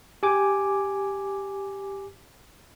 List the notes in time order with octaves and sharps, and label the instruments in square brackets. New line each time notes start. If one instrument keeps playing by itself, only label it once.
[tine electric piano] G4 G#5 D6